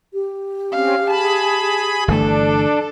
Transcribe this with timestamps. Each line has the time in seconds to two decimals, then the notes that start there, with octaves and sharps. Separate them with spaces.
0.13 G4
0.72 C4 C#4 F5
1.09 G#4 A5 B5
2.08 G1 E3 A3 D4 A4